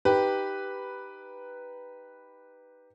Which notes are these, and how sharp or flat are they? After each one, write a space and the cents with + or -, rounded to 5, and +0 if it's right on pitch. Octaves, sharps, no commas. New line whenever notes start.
D#4 +0 G4 +0 B4 +0